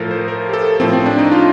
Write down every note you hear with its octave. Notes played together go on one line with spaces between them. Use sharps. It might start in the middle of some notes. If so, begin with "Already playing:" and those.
Already playing: A2 F3 A4 A#4
C5
A#4
G4
A4
A2 F3 C4
C4
D4
D#4
F4